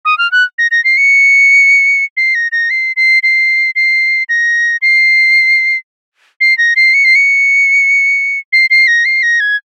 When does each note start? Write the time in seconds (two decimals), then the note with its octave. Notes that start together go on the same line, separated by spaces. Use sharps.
0.05 D#6
0.18 F6
0.32 F#6
0.58 A#6
0.71 A#6
0.84 C7
0.97 C#7
2.17 C7
2.35 A#6
2.52 A#6
2.70 C7
2.96 C7
3.23 C7
3.76 C7
4.29 A#6
4.82 C7
6.41 C7
6.58 A#6
6.76 C7
6.94 C#7
7.05 C7
7.15 C#7
8.53 C7
8.70 C7
8.88 A#6
9.05 C7
9.23 A#6
9.40 G#6